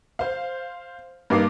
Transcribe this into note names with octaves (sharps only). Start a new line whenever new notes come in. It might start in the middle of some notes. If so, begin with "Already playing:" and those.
C5 F5
G2 A#3 D#4 D6 C7